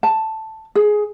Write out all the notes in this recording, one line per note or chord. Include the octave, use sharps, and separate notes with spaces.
A5
G#4